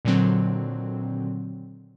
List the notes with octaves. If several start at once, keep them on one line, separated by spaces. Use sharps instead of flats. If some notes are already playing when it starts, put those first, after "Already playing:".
A#2 D3 D#3 F#3 C4